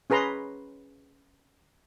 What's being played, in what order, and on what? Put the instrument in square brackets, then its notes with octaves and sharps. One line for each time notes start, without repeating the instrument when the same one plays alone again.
[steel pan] C#4 G#4 B4 A#5 C6